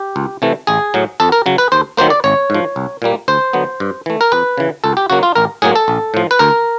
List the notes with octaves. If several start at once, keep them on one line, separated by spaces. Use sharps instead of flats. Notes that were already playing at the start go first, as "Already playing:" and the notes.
Already playing: G4
C#2
C3 E3 A3
A1 G#4
A2 F#3
F2 A4
A#4
C#3 F#3
B4
D#2 C5
D#3 F#3 A#3 C5
D5
G#1 C#5
G#2 F3
C2
A#2 G3 A#3
D2 C5
D3 F#3 B3
G2
E3 A3
A#4
F2 B4
C#3 E3
C#2 A4
G4
C#3 F#3 A#3 F#4
F4
A1 A#4
A2 F#3 A#3 G#4
A4
A#1
A2 F3
B4
D2 A#4